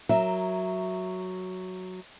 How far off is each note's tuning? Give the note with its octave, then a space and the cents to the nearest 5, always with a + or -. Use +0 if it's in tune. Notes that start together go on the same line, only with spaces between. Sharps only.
F#3 +0 A#4 +0 E5 +0